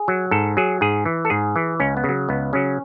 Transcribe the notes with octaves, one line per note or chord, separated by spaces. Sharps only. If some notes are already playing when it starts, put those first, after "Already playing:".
Already playing: G#4
F#3
G#2 A4
F#3 G#4
G#2 G#4
E3
A4
G#2 G#4
E3
C#2 C#4
B3
C#3
F#3
C#2 B3
C#3 F#3 C#4